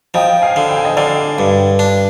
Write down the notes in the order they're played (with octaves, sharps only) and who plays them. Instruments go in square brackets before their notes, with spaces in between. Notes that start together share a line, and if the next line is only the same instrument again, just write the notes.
[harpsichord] F3 [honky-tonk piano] D#5 G5
[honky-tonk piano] F5 G#5
[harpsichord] D3
[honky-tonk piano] G5
G#5
D#5 G5
[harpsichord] D3 [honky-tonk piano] D5 F5
[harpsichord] G2
D4